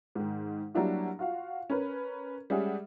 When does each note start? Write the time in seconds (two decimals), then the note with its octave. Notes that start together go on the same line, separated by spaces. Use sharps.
0.15 G#2 D#3
0.74 F#3 G3 A#3 D4 E4 F#4
1.19 F4 F#4 F5
1.70 C#4 A#4 B4
2.50 G3 G#3 C#4 G#4 E5 F#5